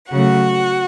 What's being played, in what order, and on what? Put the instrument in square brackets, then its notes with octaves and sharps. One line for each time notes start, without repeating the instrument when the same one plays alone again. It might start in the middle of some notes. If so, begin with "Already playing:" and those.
[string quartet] C#3 F#3 A3 F#4 F#5